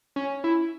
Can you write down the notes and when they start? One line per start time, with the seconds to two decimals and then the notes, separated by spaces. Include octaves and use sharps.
0.16 C#4
0.44 E4